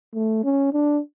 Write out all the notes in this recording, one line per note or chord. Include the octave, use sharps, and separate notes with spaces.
A3
C#4
D4